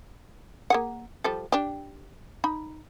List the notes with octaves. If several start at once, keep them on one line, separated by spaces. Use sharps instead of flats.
A#3 G#4 F#5
F3 G3 A4
D4 G4
D#4 B5